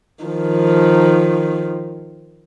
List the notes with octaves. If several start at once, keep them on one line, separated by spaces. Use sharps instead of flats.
D#3 F3